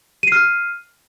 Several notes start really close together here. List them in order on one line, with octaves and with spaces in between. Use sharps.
D#7 C7 F6